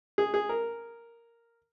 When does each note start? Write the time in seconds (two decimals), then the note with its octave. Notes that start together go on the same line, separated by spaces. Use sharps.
0.18 G#4
0.34 G#4
0.49 A#4